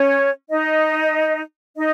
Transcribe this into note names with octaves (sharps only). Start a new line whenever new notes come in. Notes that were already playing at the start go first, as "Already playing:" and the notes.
Already playing: C#4 C#5
D#4 D#5
D#4 D#5